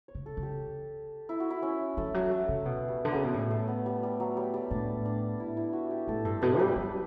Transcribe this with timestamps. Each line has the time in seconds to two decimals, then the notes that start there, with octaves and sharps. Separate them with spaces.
0.08 C#5
0.15 C#3
0.26 A4
0.37 C#3
0.43 G4
1.29 E4
1.40 F#4
1.50 E4
1.63 C#4
1.97 E3 A3
2.14 F#3
2.31 A3
2.49 C#3
2.65 B2 B3
2.88 G3
3.05 D3
3.12 C#3 F#3
3.24 B2
3.33 A2 G3
3.51 A3
3.68 B3
3.86 G3
4.03 G3
4.20 F#3
4.37 G3
4.54 G3
4.71 A2 D4
5.05 D4
5.40 E4
5.57 E4
5.73 F#4
5.91 G4
6.07 A2 A4
6.25 G2 A4
6.42 B2 B4
6.59 G3 B4
6.76 F#3